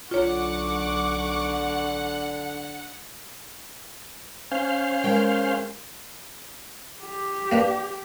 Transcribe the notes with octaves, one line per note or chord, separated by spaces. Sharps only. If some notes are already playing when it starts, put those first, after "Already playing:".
B1 D3 F4 C#5 F#5 C#6 D6
C#4 C5 F5
G#3 A#4 G5
G4
A#3 D4 B4